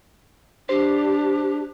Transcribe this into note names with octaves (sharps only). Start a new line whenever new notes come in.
D4 G4 C5